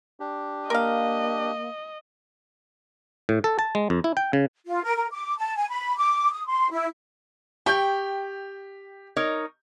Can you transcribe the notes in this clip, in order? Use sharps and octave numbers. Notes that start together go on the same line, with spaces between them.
D4 G4
A#3 A#4 D#5 F5
A2
A4
A5
G#3
F2
E4
G5
C#3
F4
A#4
A#4
D6
A5
G#5
B5
D6
D#6
C6
E4
G4 G5 C#6 G6
D#4 A#4 C#5